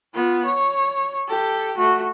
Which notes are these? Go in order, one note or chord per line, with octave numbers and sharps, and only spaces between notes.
B3 F4
C#5
G4 A4
A3 F#4